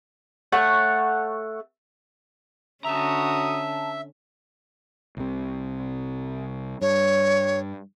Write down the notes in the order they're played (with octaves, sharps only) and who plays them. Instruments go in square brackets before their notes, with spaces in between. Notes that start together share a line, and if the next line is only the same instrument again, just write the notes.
[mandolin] A3 C#5 F#5 A5
[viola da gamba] D3 C#4 [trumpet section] F#4 D#6 [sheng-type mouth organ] E5 [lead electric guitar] A5 A#5
[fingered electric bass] C2 C3
[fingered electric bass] G2 [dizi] C#5